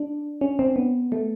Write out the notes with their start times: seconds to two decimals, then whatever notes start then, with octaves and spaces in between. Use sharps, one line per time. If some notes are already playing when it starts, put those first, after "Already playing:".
Already playing: D4
0.41 C#4
0.59 C4
0.76 B3
1.12 A3